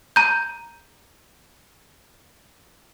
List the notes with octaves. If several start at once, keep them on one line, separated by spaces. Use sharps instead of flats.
A#5 G6